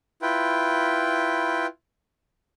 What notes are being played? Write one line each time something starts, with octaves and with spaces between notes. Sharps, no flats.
E4 F4 B4 G5